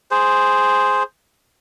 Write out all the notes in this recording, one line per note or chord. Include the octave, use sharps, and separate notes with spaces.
G#4 C5